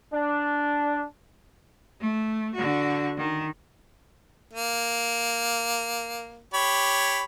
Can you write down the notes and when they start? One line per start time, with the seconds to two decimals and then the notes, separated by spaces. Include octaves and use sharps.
0.13 D4
2.01 A3
2.54 D3 F#4
3.17 D#3
4.53 A#3
6.54 G4 C#5 B5